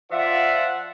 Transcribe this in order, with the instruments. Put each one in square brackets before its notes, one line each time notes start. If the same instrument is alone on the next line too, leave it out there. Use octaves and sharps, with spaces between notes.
[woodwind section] F3 F#5 [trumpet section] F4 D5 E5